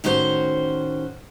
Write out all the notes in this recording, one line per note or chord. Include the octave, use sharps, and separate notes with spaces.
A2 D#3 C#4 F#4 C5